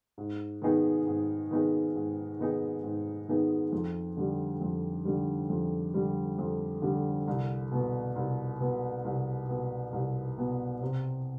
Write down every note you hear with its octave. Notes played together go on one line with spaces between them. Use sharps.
G#2
D#3 B3 D#4 G#4
G#2
D#3 B3 D#4 G#4
G#2
D#3 B3 D#4 G#4
G#2
D#3 B3 D#4 G#4
F2
D3 G3
F2
D3 G3
F2
D3 G3
F2
D3 G3
C2
B2 B3
C2
B2 B3
C2
B2 B3
C2
B2 B3
C3